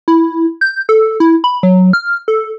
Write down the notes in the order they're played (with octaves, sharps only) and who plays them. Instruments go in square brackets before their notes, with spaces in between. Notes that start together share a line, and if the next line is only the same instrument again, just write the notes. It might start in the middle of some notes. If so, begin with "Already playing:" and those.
[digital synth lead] E4
G6
A4
E4
B5
F#3
F6
A4